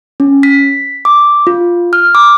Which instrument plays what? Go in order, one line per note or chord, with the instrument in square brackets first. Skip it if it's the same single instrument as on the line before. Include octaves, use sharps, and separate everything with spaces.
[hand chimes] C#4
B6
D6
F4
F6
D6